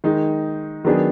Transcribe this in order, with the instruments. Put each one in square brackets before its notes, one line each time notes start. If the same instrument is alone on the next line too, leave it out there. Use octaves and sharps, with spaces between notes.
[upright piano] D#3 G#3 D#4
D#3 F#3 B3 D4 G#4